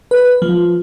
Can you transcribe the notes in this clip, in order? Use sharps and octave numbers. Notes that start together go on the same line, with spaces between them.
B4
F3